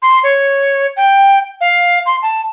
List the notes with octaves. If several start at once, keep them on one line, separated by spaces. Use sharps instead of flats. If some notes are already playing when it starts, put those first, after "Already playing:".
C6
C#5
G5
F5
C6
A5